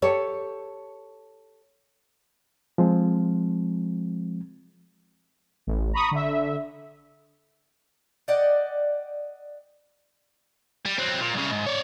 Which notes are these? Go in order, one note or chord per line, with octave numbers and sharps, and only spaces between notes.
G4 A4 C#5
F3 G#3 C4
A1
A#5 B5 C#6 D#6
D3 E5
D5 D#5 F#5 G5
G3
F#3 C4
A#2
C2 C#3
G#2
C#5 D5